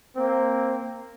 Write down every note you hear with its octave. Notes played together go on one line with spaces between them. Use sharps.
A#3 C4